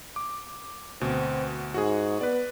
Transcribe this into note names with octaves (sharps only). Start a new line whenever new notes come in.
D6
D2 B2 C4
G#2 F#4 G#4
B3 B4 D5